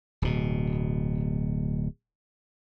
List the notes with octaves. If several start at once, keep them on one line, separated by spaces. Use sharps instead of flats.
D1 B2